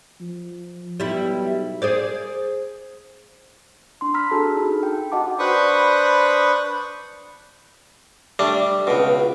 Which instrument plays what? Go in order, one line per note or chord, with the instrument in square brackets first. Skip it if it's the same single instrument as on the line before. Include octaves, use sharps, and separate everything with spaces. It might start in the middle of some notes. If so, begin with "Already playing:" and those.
[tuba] F3
[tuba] B1 [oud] G3 E4
[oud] G#4 C5 D5
[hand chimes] D4 C6
A#5 B5 E6 F6 B6
D4 F#4 G#4 A4 A5
D#4 B5
G5
F#4 D#5 F#5 A5 D6
[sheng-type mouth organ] D4 B4 C5 B5 C#6 D#6
[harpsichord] G3 A3 D4
C#2 B2